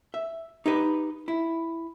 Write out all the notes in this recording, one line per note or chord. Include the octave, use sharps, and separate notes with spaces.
E5
D#4 G4 B4
E4